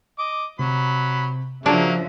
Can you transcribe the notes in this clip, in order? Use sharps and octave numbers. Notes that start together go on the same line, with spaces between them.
D#5 D6
C3 F#3 B5
C#3 F3 F#3 A#3 D4 F#4 G#4 E5